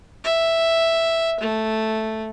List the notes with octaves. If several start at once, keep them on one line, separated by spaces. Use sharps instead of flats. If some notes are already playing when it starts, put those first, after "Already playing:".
E5
A3